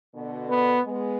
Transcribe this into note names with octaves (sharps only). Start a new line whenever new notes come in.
B2 D3
B3
G#3 B3